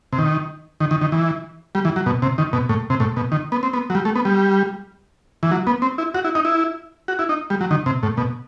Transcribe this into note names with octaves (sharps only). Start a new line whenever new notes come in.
C3
D#3
D#3
D#3
D#3
E3
G3
E3
F#3
B2
C3
D#3
B2
A2
C3
A2
B2
D#3
B3
C4
B3
F#3
G3
A3
B3
G3
E3
F#3
B3
C4
E4
F#4
E4
D#4
E4
F#4
E4
D#4
G3
F#3
D#3
C3
A2
B2